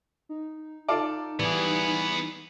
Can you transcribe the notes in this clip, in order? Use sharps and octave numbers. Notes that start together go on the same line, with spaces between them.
D#4
F4 A4 D5
E3 G3 B3 G#4